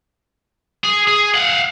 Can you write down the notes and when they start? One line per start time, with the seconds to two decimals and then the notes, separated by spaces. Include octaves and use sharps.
0.84 G#4
1.07 G#4
1.34 F5 F#5